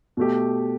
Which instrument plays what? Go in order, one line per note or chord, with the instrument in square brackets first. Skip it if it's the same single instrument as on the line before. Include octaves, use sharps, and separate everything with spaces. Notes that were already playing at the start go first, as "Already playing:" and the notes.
[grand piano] B2 A3 G4